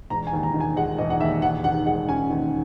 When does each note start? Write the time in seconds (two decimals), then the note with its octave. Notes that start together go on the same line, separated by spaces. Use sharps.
0.10 E1 A#5
0.27 G#5
0.33 D#2
0.43 A#5
0.54 D#3
0.60 G#5
0.76 G#3 F#5
0.98 E1 D#5
1.10 F#5
1.20 D#2 E5
1.42 D#2 F#5
1.64 D#3 F#5
1.86 G#3 F#5
2.09 C#4 G#5
2.30 D#2